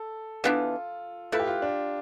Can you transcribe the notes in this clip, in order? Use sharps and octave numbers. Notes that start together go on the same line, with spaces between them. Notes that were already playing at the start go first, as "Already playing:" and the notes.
Already playing: A4
E3 B3 D4 F4
A3 E4 F4 B4
G4
F4
D4